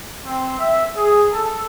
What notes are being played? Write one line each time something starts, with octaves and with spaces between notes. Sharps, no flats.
C4
E5
G#4
A4